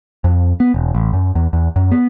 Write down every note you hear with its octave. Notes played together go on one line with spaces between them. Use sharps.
F2
B3
E1
A1
F#2
E2
E2
F#2
B3